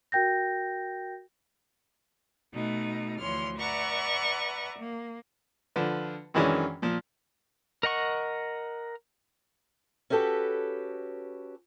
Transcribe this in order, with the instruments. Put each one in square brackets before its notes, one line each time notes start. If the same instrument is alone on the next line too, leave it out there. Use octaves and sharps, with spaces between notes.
[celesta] F#4 A#4 G5 G6 A#6
[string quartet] B2 A3 D#4
D2 E3 F3 C#5 C6 F6
B4 D5 E5 F#5 A#5 C#6
A#3
[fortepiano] D3 F3 B4
F#2 D#3 E3 G#3 C#4 D4
A#2 F3
[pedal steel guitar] A#4 D#5 F#5 C#6
[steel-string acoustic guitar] C#4 F#4 G4 A4 B4